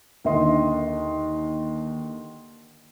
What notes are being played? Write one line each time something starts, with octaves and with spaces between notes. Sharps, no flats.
D#2 D3 D#5 C6